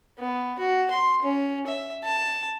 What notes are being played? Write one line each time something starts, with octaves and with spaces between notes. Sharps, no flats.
B3
F#4
C6
C#4
E5
A5